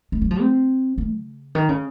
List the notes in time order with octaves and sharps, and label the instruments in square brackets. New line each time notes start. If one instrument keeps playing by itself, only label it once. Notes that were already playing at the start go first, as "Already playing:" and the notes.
[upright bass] G#3
F#3
F3
C4
A#3
C#3
D#3
C#3